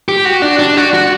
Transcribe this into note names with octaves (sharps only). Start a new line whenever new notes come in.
G4
F#4
D4
D4
F#4
F#4